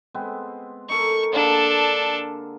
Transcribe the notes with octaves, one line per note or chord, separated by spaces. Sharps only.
G#3 B3 C4
D#4 A4 A#4 C#6
D3 A#3 D4 G#4 A4